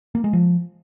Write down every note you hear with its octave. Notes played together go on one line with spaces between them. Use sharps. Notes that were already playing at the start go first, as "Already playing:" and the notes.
A#3
G#3
F3